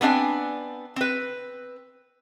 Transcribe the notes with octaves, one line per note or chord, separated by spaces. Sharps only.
B3 C4 D4 E5 G#5
C4 B4